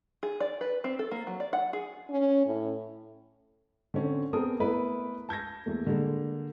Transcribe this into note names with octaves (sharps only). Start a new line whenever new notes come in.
G#4
D5
B4
C4
A4
A#3
F#3
D5
F#5
G#4
C#4
A2
D3 C4 C#4
B3 C4 G#4 A#4 A5 D#6
A3 B3 E4 A#4 B4
A5 G6 G#6 A#6
E2 A3 A#3
D3 G3 G#3 A#3